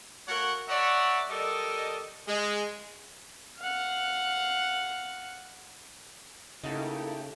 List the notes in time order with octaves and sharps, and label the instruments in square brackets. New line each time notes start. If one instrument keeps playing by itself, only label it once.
[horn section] A3 F#4 A#4 C#5 F5 F#5
A#4 C#5 D5 E5 F#5
G3 A4 A#4 D5 D#5
G#3
[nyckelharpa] F5 F#5
[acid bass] C#3 [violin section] A3 G4 [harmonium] A#3 E4 [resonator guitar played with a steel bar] D#4 F#4 A4